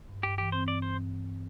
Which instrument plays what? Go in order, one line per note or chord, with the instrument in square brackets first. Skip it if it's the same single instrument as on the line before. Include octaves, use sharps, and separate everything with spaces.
[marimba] G2
[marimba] G2 [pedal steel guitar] G4
[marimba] E3 [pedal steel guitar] G4
[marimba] C4 [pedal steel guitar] C5
[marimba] G2 [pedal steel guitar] D5
[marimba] G2 [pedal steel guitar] C5